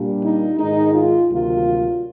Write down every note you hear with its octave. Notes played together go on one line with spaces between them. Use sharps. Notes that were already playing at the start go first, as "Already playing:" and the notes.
Already playing: A#2 G3 A#3 D4
D#4
G#2 D#3 G#3 D#4
F4
D2 C3 D#3 F#3 A#3 F4